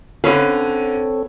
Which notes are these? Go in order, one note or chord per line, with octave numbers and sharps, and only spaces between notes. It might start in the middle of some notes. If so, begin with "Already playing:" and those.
D3 C4 C#4 A4 B4 C#5 F5